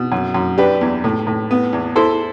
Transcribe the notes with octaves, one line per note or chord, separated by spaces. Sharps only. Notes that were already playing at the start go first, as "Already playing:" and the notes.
Already playing: B2
F#2
F#2
D4 G4 B4
E2
A2
A2
B3
E2
E4 A4 C5